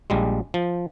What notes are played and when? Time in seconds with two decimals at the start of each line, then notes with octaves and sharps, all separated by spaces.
0.10 A#1 G3 G#3
0.54 F3